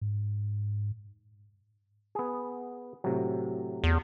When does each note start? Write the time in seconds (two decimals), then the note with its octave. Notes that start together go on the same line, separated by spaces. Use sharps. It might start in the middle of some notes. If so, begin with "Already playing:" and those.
0.01 G#2
2.15 B3 G#4
3.04 A2 C3 F#3
3.84 E2